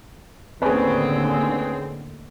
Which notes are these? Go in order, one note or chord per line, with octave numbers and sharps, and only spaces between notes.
D#2 A2 D3 C4 C#4 G#4 B4